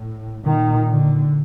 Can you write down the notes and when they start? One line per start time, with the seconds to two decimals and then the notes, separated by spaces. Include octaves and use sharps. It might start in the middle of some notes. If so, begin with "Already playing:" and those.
Already playing: A2
0.45 A#2 D#3
0.91 D3